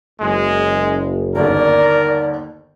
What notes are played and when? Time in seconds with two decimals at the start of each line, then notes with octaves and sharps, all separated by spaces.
0.21 F#1 G#3
1.35 G1 D#2 D3 A#4 D5